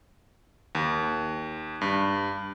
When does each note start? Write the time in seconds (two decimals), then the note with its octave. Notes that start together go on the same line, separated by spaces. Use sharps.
0.75 D#2
1.81 G2